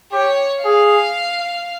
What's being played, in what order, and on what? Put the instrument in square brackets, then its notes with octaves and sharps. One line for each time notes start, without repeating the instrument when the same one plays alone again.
[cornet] G4 [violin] C#5
[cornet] G#4 [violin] F5